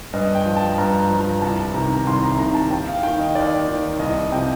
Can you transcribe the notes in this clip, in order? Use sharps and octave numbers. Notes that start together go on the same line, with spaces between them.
G2 D#5
G5
F3
A5
G2 A#5
A#5
F3
A#5
C2 A5
C3 D#3 A#5
C2 C6
A#5
C3 D#3 A#5
A5
D#2 G5
F5
D#3 G5
D#5
D#2 D5
D#3
C2 D#5
C3 F3 G5